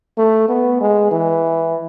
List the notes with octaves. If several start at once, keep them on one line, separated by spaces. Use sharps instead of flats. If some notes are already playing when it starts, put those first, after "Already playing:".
A3
B3
G#3
E3